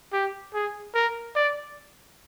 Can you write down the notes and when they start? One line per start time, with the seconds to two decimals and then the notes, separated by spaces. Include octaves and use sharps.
0.13 G4
0.54 G#4
0.94 A#4
1.35 D5